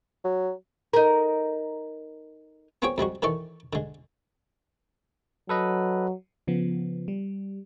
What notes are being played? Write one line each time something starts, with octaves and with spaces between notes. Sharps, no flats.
F#3
D#4 A#4
B3 C4 F4 G#4 C#5 G5
F2 G3 G#3 F#4
D#3 E3 A4 D5 C#6
D3 G#3
F#3 A4 B4 D#5
C#3 F3 B3
G3